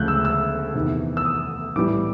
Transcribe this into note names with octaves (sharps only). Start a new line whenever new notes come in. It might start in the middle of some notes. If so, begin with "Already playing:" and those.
Already playing: D2 C#3 F3 G#3 F#6 G6
E6
E6
E2 C3 D#3
E6
D#6
A2 E3 G3 D6